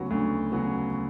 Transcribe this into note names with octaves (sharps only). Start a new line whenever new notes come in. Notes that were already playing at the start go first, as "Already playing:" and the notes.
Already playing: D2 C#3 F#3 B3 F#4
D2
C#3 F#3 B3 F#4